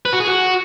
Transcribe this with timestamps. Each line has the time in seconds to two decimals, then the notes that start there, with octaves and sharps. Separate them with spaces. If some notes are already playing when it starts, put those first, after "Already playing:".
0.05 B4
0.13 F#4
0.20 G#4
0.27 F#4